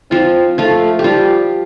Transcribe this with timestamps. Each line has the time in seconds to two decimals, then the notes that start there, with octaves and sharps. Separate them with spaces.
0.11 F3 C4 F4
0.58 F3 A3 F4
0.99 G4
1.04 F3 G3 F4